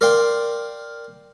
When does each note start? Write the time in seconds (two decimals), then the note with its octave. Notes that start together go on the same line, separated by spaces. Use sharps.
0.01 A#4 D5 F5 G5 C6